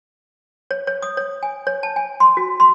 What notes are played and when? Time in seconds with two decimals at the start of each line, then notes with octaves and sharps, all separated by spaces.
0.71 C#5
0.87 C#5
1.02 D#6
1.17 C#5
1.43 G#5
1.67 C#5
1.83 A5
1.96 G#5
2.20 C6
2.37 F#4
2.60 C6